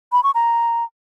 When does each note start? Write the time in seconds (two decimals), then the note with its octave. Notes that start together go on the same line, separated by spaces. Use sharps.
0.12 B5
0.24 C#6
0.35 A#5